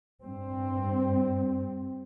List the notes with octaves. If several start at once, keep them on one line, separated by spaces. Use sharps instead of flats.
G2 C4